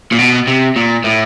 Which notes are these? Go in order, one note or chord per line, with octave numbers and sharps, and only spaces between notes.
A#2
B2
C3
A#2
A2